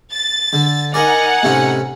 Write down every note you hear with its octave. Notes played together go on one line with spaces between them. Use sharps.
A6
D3
D#4 A#4 D5 F#5 G#5
A2 C3 C#4